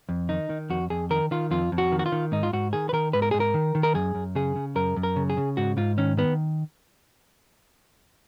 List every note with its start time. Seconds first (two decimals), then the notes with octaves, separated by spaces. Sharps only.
0.09 F2
0.29 D#3 D#4
0.50 D#3
0.70 F2 F#4
0.90 F2 G#4
1.10 D#3 A#4
1.31 D#3 F4
1.51 F2 F4
1.72 F2
1.78 F#4
1.92 D#3
1.99 F#4
2.06 F4
2.12 D#3
2.32 G#2 D#4
2.43 F4
2.53 G#2 F#4
2.73 D#3 G#4
2.89 B4
2.93 D#3 A#4
3.13 G#2 B4
3.22 A#4
3.31 G#2 G#4
3.40 A#4
3.54 D#3
3.75 D#3
3.83 A#4
3.94 F#2 G#4
4.15 F#2
4.35 C#3 G#4
4.56 C#3
4.75 F#2 A#4
4.96 F#2
5.03 A#4
5.16 C#3
5.30 G#4
5.37 C#3
5.57 G#2 F#4
5.77 G#2 F4
5.97 D#3 C#4
6.17 D#3 B3